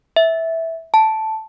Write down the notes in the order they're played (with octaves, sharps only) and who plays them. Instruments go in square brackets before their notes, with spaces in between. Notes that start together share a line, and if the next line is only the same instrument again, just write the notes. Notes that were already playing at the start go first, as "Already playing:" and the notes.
[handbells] E5
A5